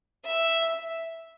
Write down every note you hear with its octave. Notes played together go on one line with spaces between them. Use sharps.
E5